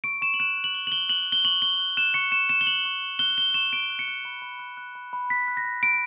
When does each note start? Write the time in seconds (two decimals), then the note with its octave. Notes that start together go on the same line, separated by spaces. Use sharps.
0.04 C#6 D7
0.22 C#6 E7
0.34 F#7
0.39 F#6 E7
0.57 F#6
0.64 F#7
0.74 C#6 G7
0.87 F#7
0.92 C#6 G7
1.09 F#6 F#7
1.26 F#6
1.32 G7
1.44 C#6 F#7
1.62 C#6 G7
1.79 F#6
1.97 F#6 E7
2.14 C#6 C#7
2.32 C#6 E7
2.49 F#6 E7
2.61 G7
2.67 F#6 F#7
2.85 C#6
3.02 C#6
3.19 F#6 G7
3.38 F#6 G7
3.54 C#6 E7
3.72 C#6 D7
3.90 F#6
3.99 C#7
4.08 F#6
4.25 B5
4.42 B5
4.59 F#6
4.77 F#6
4.95 B5
5.13 B5
5.30 F#6 B6
5.48 F#6
5.57 A#6
5.65 B5
5.83 B5 D7